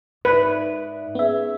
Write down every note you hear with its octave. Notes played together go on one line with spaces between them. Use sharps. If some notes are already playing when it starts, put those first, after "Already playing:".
G#2 D#4 B4 D5 E5
B3 C#4 G#4 E5